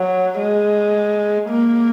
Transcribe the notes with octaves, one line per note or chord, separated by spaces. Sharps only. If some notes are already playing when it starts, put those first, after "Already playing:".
Already playing: F#3
G#3
A#3